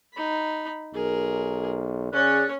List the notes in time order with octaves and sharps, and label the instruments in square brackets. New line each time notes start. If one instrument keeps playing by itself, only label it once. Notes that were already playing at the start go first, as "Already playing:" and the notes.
[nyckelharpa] D#4 B5
[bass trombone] B1 [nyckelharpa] G#4 A#4
[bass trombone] C#3 [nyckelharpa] C#4 C#5 [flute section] G#4 D5 F#6